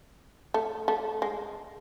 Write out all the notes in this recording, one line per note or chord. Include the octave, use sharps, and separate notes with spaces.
A3
A3
G#3